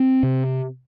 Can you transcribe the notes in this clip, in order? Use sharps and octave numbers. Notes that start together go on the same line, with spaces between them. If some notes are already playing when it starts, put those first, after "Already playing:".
Already playing: C4
C3